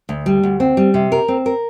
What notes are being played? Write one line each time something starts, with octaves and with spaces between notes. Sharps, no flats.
D2
G3
D2
C4
G3
C3
A#4
C4
A#4